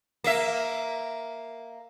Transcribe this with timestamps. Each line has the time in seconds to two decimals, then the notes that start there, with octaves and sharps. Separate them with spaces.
0.24 A#3 E5